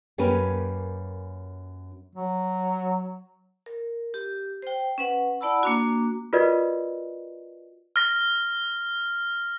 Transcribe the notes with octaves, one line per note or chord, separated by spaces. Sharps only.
F#2 A#3 C#4 G4 B4 G#5
F#3
A#4
G4
C5 G5
C#4 B4 F#5
E4 D5 F#5 A5 B5 E6
A#3 D4 F#4
F4 F#4 A#4 B4 D5 D#5
F6 A#6